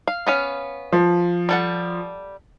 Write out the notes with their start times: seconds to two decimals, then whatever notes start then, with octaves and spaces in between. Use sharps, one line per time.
0.08 F5
0.27 B3 C#4 F5
0.92 F3
1.49 G3 A4 F#5